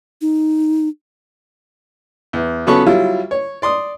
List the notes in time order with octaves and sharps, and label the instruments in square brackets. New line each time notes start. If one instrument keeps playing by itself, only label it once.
[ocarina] D#4
[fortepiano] E2
C#3 F#3 B3 A4 B5 C#6
F#3 G3 E4 F4
C#5
D5 C6 D#6